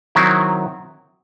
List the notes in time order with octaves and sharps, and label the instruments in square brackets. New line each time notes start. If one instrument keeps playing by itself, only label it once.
[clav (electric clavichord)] D#3 F#3 C4 E4